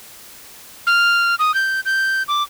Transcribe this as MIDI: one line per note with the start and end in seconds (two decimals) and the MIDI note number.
0.87 1.35 89
1.39 1.54 87
1.54 1.80 91
1.85 2.23 91
2.28 2.43 86